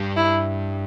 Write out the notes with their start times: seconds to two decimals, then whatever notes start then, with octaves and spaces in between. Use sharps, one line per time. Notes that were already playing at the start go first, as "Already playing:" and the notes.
Already playing: G2 G3
0.16 E4